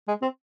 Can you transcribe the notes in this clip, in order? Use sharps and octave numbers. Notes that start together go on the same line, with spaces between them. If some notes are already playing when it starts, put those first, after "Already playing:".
G#3
C4